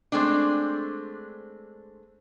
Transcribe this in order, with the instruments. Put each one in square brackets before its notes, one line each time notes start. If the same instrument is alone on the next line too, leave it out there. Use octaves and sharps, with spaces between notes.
[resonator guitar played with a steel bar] G#3 A3 C4 D4